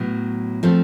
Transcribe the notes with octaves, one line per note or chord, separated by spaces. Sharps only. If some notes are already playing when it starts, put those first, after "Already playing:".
Already playing: A2 F#3 B3
F3 A3 C4